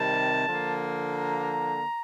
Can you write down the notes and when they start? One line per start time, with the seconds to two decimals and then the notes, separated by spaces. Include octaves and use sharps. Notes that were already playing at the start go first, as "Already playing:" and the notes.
Already playing: C3 D#3 G3 C4 A5
0.47 D3 F3 A#3
1.15 A#5